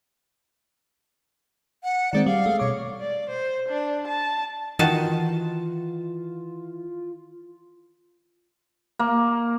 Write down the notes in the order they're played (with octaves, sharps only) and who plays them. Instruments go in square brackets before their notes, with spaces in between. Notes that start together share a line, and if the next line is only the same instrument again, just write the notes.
[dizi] F#5
[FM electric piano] D#3 G#3 C4 [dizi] D5
[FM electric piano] G3 [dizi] F5
[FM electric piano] G#3 A3
[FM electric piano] B2 D6 [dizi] C#5
[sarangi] D5
C5
D4
A5
[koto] D#3 F#4 A5 [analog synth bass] E3 [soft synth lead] F4
[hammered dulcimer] A#3